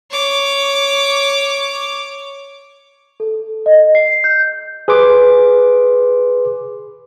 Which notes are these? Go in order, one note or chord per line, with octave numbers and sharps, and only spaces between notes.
C#5 D6
A4
D#5
C7
G6
G#4 B4 C6 D6